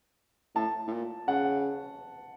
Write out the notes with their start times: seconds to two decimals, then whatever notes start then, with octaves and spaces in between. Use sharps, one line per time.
0.55 A2 A5
0.87 A2
0.92 A#2
1.27 C#3 F#5